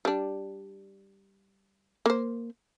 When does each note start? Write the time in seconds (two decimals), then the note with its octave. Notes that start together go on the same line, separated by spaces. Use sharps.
0.05 G3 D4
2.06 A#3 C5